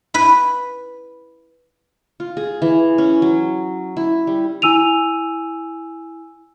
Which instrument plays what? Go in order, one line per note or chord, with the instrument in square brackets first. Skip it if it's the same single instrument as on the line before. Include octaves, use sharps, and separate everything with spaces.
[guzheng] E4 B4
[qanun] F4
G#4
E3
C#4
F#3
E4
G3
[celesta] E4 G#5 E6 D#7 F7